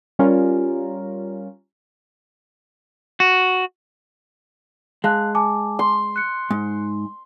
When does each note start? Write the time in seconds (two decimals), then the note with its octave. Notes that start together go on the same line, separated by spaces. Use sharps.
0.19 G3 C#4 F4 A#4
3.20 F#4
5.04 G#3 F5 A5 F#6
5.35 G#5 A5 D6
5.79 C6
6.16 F#6 C#7
6.51 G#2